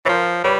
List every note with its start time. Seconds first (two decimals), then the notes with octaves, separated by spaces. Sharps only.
0.05 E3 C#5
0.09 F3 A#4 C5
0.44 G3 B4 C#5